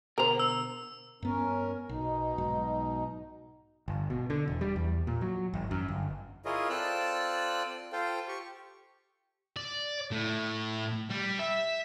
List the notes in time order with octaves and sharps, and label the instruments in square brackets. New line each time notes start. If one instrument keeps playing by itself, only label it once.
[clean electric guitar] B2 D3 A#5 [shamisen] A#4 C5
[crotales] E6
[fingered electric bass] G2 B3 [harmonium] C#4 A#4
[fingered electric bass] B1 [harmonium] B2 D#4
[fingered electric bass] B1 G#2 F#3
G1
B2
D3
E1
G3
E2
A#2
F#3
G#1
F#2
G1
[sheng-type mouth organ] E4 F4 G#4 A#4 C#5 D#5
C4 F4 A4 D5 E6 F#6
F4 A4 C5 F5 G5
G4 C#6
[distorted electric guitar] D5
A2
G3
E5